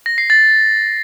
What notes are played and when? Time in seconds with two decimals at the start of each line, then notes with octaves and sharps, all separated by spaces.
0.06 A#6
0.18 C7
0.30 A6